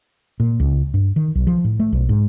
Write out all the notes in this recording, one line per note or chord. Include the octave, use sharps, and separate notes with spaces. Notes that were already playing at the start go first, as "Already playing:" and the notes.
A#2
C#2
G2
D#3
B1
F3
A2
A3
B1
G#2